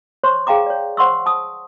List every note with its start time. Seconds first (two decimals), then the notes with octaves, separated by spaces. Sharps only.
0.23 C5 C#5 C6 C#6
0.47 G#4 F5 G5 A#5 D6
0.66 C#5 D5
0.97 C5 F#5 C6 C#6 E6
1.26 A5 D#6